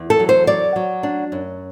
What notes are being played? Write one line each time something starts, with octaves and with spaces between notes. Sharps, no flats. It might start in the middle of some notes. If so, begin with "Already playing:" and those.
Already playing: E2
A4
F#3
C5
F#3 D5
F#3
D4
F#2